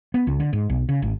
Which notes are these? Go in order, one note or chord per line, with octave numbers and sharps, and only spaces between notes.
B3
C#2
D3
G#2
B1
C#3
G#1